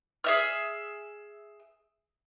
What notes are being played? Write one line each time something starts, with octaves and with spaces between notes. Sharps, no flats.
G#4 E5 F6